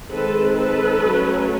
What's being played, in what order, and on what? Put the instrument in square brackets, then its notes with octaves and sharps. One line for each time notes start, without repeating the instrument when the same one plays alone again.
[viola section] D#3 G#3 C4 A4 B4
A4 B4
F#3 A3 C#4